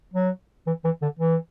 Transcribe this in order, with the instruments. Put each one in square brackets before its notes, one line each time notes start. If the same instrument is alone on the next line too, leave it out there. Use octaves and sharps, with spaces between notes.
[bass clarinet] F#3
E3
E3
D3
E3